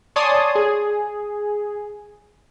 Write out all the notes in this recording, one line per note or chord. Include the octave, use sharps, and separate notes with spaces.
C#5 D5 G#5 A5 C6 D#6
G#4